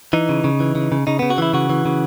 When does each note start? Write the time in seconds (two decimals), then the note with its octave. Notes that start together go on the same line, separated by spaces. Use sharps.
0.13 E3 D#4
0.29 C#3
0.44 C#3
0.60 E3
0.75 C#3
0.92 C#3
1.07 C#3 D#4
1.19 C#3 B3
1.30 F#4
1.38 E3 E4
1.53 C#3 F#4
1.70 E3
1.86 C#3